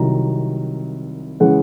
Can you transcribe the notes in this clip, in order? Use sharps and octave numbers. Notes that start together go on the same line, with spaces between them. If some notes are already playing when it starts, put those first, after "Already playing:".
Already playing: C2 C3 D#3 F#3 A#5
C#3 E3 G#3 F#5